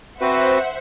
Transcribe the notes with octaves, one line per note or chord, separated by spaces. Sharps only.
C4 F#4 B4 C5 E5 F#5